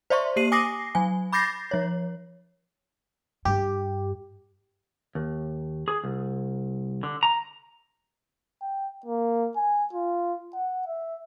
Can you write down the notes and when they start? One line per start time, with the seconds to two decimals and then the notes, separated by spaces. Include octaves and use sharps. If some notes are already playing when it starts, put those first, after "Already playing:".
0.10 C5 D5 E5 C6 C#6
0.36 A#3 G4 C7 D#7 F#7
0.52 G#5 D6 D#6 A#6 C7
0.95 F#3 G#5
1.33 B5 D6 G6 A6 A#6 C7
1.71 F3 C#5
3.45 G2 G4
5.15 D#2
5.88 G#4
6.04 C2
7.03 D3
7.23 A#5
8.62 G5
9.06 A#3
9.57 G#5
9.93 F4
10.54 F#5
10.87 E5